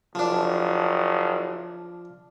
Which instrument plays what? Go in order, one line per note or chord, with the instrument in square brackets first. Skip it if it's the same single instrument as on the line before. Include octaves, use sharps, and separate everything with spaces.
[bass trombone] F#1 [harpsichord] F3 D4